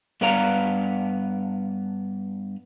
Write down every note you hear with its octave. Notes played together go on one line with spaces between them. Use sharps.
G2 B3 B4 D5 F5 A#5